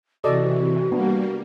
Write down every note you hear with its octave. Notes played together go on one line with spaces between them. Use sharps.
C3 E3 F#4 A4 D5 D#5
G3 A#3 B3 D4